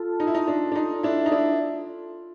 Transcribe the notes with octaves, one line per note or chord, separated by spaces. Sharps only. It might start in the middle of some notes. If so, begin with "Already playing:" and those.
Already playing: F4 A4
D#4
E4
D#4
D4
D4
D#4
D4 E4
D#4
D4 E4